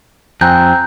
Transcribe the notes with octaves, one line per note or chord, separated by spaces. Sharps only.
F2 C4 G#5 A#5 F#6 G6